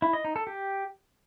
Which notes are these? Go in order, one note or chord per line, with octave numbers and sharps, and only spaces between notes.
E4
D#5
D#4
A4
G4